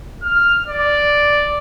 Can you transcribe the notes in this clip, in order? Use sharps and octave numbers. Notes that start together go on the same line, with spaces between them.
F6
D5